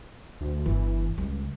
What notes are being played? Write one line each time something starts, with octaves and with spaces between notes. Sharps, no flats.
D2
G1 E3
C#2 G3